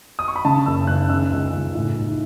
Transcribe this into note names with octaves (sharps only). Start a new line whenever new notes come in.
D#6
C#6
B5
C#3 A5
F#1 E6
F#1 F#6
C#3 E6
C#2
C#2
A2
B1